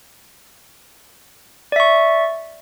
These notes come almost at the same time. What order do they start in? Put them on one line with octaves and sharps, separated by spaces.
D5 E5 C#6